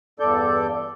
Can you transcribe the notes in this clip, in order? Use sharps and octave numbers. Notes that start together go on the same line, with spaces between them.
E2 G2 A4 D5 G6